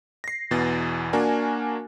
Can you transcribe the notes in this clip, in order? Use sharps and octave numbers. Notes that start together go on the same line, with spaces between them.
A#6 C7
E2 B2 E3 A6
A#3 D4 F#4 A#4 G#5